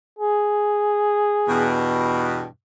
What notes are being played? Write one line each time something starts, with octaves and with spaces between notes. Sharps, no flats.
G#4
E2 G2 B2